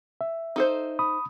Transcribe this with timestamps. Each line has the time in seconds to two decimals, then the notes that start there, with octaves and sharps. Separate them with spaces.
0.21 E5
0.56 D#4 A4 C5
0.99 B5 D#6